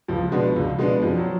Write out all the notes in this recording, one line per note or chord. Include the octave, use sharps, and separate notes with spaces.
C#2 F3
B2 G#3 B3 D4
C#2
B2 G#3 B3 D4
F2 F3
F#3